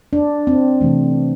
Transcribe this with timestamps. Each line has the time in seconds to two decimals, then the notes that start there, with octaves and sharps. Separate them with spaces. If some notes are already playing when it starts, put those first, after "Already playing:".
0.13 D4
0.47 C4
0.81 C3 E3 A3